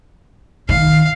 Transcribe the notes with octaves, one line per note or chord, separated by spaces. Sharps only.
D#3 F5